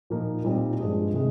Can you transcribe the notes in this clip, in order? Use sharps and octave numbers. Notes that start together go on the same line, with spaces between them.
A#2 F3 A#3 D#4
A#2 G3 C4 D#4
G2 F3 G#3 D4 G#4
C3 D#3 G#3